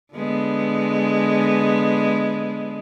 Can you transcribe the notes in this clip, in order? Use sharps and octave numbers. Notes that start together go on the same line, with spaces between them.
D3 G#3 B3